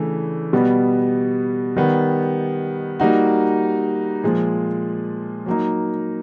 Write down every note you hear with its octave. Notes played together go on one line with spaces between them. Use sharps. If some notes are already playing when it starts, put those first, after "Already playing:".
Already playing: C#3 E3 A3 D4
B2 G3 B3
D#3 G3 B3
G3 A#3 D#4 F#4
A#2 F3 G#3
F#3 A#3 D#4